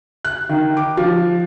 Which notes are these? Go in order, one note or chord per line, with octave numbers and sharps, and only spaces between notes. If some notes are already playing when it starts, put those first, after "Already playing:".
F#6
D#3
D6
F3